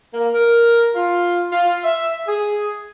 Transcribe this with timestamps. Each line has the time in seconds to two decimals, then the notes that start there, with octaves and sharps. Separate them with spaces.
0.14 A#3
0.33 A#4
0.95 F4
1.52 F4
1.84 E5
2.27 G#4